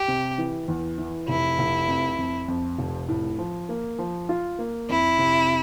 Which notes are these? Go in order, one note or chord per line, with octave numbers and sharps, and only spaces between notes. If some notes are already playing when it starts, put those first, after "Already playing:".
Already playing: G4
C3
E3
E2
E3
F1 E4
F1
F2
F2
F2
F1
A2
F3
A#3
F3
F4
A#3
F2 E4
C3